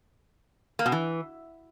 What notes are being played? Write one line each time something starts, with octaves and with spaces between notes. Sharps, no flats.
A#3
B2
E3